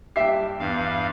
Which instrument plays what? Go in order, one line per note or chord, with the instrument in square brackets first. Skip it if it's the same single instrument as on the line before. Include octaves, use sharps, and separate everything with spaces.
[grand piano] G2 G5 C7 [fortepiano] G4 E5
[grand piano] E2 [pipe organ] G2 F5